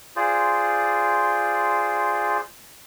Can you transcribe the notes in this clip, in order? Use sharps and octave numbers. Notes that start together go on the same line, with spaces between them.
F4 G#4 C5 D5